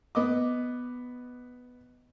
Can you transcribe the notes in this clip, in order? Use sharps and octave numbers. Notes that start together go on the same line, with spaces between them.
B3 D#5 D6